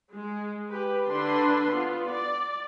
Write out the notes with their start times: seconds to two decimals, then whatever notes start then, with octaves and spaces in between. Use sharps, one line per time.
0.13 G#3
0.69 G4 B4
1.08 D3 D4 B4 C6
1.72 B3 F4
2.10 D5